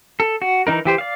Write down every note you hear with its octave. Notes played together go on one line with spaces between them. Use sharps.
A4
F#4
E3 D#4 A#4
E3 G4 C5
D5 F5